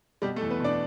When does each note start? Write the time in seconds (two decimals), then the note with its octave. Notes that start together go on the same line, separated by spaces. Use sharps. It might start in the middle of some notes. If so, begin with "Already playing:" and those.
0.22 B2 G3 G4
0.36 A3 A4
0.41 E2
0.50 B3 B4
0.60 B2 D4 D5